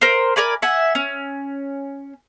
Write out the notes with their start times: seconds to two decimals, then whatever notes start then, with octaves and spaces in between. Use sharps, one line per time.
0.01 A#4 C5
0.36 A#4 D5 G#5 B5
0.62 E5 F#5 G#5
0.95 C#4